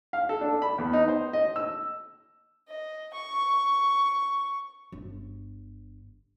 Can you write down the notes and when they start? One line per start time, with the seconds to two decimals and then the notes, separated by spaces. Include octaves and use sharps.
0.13 F5
0.29 A4
0.41 D4
0.62 B5
0.78 E2
0.93 D#4
1.08 C5
1.33 D#5
1.56 E6
2.68 D#5
3.14 C#6
4.92 G1